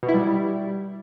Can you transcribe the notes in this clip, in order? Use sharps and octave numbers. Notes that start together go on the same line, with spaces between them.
B2
E4
G3